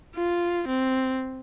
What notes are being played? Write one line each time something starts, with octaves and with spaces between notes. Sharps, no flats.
F4
C4